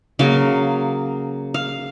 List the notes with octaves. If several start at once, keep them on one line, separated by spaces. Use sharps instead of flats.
C#3 F#3 A#3 F5
F5